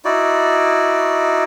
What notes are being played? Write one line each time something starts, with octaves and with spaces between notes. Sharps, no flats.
D#4 E4 F#4 D5